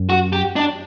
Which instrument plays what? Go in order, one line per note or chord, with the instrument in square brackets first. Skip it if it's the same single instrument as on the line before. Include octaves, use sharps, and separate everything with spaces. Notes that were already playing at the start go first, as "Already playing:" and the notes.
Already playing: [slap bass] F#2
[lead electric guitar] F#4
G4
D4